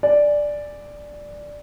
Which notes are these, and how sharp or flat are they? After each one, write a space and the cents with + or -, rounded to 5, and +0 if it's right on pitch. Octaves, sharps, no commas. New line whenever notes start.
D5 +0 G#5 +0